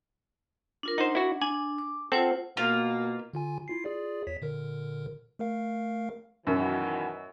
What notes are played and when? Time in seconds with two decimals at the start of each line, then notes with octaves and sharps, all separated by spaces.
0.83 D4 F4 A#4
0.98 D4 D#4 C5 F#5
1.15 E4 F#4
1.41 D4 G#5
1.78 D6
2.12 C4 F4 A4 C5 F#5
2.57 B2 A#3 F4
3.33 D3 F4 G#5
3.68 E4 F4 C7
3.85 F4 G#4 D5
4.27 E2 C#5 B6
4.42 A#2 D3 A#4
5.39 A3 A#4 F5
6.47 F#2 B2 D#3 E3